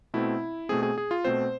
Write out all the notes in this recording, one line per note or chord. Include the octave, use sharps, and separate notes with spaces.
B2 A3 C4 E4
B2 A3 C4 G#4
G#4
G#4
F4
B2 A3 C4 C5